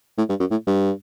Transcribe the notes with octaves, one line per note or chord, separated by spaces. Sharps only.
A2
G2
F#2
A2
G2